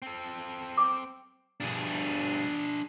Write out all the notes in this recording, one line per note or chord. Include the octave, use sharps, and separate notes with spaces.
C4 A4
D6
G2 B2 D4 G#4